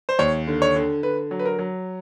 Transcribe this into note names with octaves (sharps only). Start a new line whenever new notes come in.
C5
D#2 C#5
D3
C#5
D3
D3 B4
F#3
B4
A#4
F#3